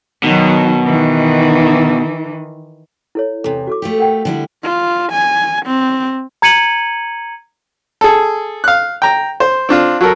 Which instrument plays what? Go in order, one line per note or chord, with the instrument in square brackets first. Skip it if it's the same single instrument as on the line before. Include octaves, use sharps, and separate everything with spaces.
[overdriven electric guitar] B2 [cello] D#3 F#3
[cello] D#3 E3
[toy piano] E4 A4 C#5
[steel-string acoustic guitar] E2 C3 [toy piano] A4
[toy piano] F#4 A4 D6
[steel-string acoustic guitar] A3 F4 G4
[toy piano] A#4 F#5 G5
[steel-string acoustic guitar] D3 G3 E4
[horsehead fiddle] F4
G#5
C4
[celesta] A#5 G#6 C#7 D#7 F#7
[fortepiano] G#4 A4
F5 F#6
G5 A#5
C5
C4 D4 F4
F#3 A4 A#4